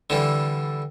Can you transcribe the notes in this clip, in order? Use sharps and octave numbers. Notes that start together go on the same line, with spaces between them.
D3 E3 G3